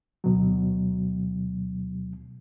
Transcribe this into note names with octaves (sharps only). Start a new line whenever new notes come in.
D2 B2 F#3